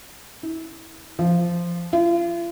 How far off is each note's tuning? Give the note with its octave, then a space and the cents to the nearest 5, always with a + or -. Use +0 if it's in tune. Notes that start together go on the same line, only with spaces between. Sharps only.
E4 -20
F3 -10
F4 -40